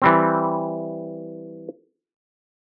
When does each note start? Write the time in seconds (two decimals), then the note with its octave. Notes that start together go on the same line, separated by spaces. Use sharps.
0.02 E3 G3 C4